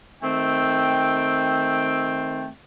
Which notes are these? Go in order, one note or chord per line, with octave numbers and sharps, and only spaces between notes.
D#3 A3 C4 G5